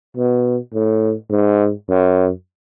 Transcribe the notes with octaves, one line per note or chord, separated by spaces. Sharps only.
B2
A2
G#2
F#2